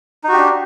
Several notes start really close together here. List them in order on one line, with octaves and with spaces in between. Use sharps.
D#4 F#4 G4 D4